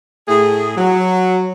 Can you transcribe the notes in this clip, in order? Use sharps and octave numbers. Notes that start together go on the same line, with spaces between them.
A2 A3 G#4
F#3